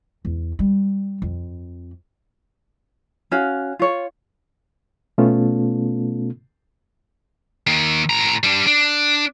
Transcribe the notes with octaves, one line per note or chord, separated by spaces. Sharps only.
E2
G3
F2
C#4 F#4 F5
F4 C#5
B2 A3 B3 C#4 F4 A4
D#3 A#3
A2 A#5
G3 D4
D4